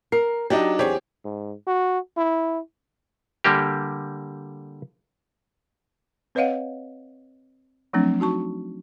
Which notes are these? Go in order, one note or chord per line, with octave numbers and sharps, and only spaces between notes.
A#4 C7
F#3 D4 D#4 G4
E2 C4 G4 G#4 C#5 D5
G#2
F#4
E4
D3 G3 A#3 G4
C4 B4 C#5 D#5 F5 F#5
F3 F#3 A3 C4 D4
D#4 F#4 A5 C#6